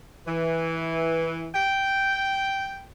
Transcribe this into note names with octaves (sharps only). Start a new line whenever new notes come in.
E3
G5